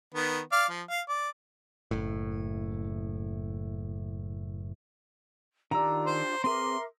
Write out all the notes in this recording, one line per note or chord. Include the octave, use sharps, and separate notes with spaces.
D#3 B3
D5 F5 F6
F3
F5
D5
F#1 A2
D#3 D4 F4 G4 A#5 E6
C5
C4 G#4 A#4 B4 E5 C6 D6